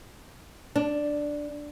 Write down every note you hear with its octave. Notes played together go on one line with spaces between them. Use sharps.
D4